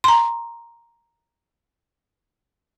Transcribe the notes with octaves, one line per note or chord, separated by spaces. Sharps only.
A#5 C6